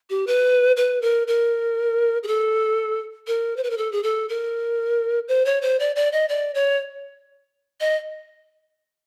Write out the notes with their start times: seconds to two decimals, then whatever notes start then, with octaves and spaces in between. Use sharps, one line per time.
0.10 G4
0.27 B4
0.77 B4
1.02 A#4
1.28 A#4
2.23 G#4
2.27 A4
3.27 A#4
3.57 C5
3.64 B4
3.70 A#4
3.78 A4
3.92 G#4
4.03 A4
4.29 A#4
5.28 C5
5.45 C#5
5.62 C5
5.80 D5
5.96 D5
6.12 D#5
6.29 D5
6.55 C#5
7.80 D#5